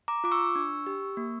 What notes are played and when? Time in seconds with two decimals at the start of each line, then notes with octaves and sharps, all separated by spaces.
0.08 A#5 D6
0.24 F4 D6
0.31 C#6 E6
0.55 D4
0.87 G4
1.17 A#3